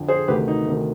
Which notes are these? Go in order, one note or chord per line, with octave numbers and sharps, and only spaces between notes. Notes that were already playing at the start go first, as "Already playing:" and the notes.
Already playing: F2 D3
G#4 C5
D2 C3 D#3 G4 B4
D#4
D2 C3 D#3